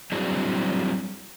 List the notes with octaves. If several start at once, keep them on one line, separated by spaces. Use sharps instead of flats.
F#3 G3 C4 D4 E4 G#4